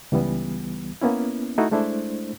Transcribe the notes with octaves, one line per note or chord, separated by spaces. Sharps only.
C#2 E3 G3 B3
A#3 B3 C#4 E4
A3 D#4 E4 F#4
G#3 A3 D4 E4 C5